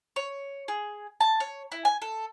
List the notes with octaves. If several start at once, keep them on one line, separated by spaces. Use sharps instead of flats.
C#5
G#4
A5
C#5
E4
G#5
A4